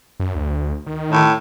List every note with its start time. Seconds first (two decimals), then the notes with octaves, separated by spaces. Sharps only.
0.20 F#2
0.35 D2
0.87 D#3
1.12 A2